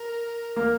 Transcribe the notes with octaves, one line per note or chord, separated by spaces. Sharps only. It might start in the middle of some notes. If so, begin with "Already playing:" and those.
Already playing: A#4
A#3